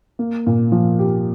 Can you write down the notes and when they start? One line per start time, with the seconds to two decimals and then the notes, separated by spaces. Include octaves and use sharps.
0.19 A#3
0.47 A#2
0.72 F3
0.99 G4